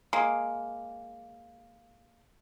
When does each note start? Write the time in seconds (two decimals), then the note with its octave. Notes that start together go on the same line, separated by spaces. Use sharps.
0.13 G#3 A#3